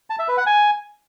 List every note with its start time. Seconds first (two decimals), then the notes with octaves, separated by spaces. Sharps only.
0.10 A5
0.19 E5
0.28 B4
0.37 F#5
0.46 G#5